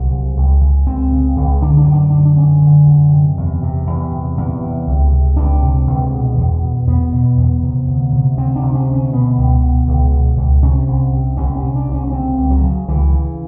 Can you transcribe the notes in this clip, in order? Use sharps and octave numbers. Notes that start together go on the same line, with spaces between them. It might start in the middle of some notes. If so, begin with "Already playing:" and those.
Already playing: C2 F#3
C#3
C#2
C#3
C#2 C4
C#3
C#2
D3 D4
D4
F#2
D4
D3 D4
D4
F#2 C#4
D3
F#2
C3
E2
C3
E2
C3
E2
C3
C#2
C3
C#2 D4
C3
C#2
B2
E2
B2
E2 B3
B2
E2
C3
D2
C3
D2 C4
D4
C3
C#4
D2
C#4
B2 B3
C#2
B2
C#2
B2
C#2
C3 C#4
C2
C3
C2 C#4
C#4
C3
D4
C2
C#4
C#4
C#3 C4
C#2
F#3
C#3
C#2 E3
C#3